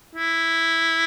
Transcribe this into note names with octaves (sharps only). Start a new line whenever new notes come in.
E4